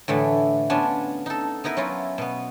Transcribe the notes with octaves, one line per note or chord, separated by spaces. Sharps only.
A2 D3 E3 A3
B3 C#4 D4 F4
D#4 A4
B3 D#4 E4 A#4 B4
F#3 C#4 E4 F4
B2 B3